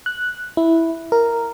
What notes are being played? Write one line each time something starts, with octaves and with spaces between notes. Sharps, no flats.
F#6
E4
A#4